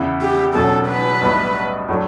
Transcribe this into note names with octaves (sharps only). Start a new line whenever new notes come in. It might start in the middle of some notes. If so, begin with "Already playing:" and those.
Already playing: E2 C#3 E3 B3 E4
G4
E1 E2 B2 F#3 C#4 A4
B4
B1 A2 G3 B3 E4
A2 F#3 A3 D4